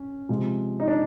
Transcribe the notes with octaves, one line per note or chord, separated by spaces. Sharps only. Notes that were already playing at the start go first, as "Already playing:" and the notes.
Already playing: C#4
C3 F3 G#3
D#4
D4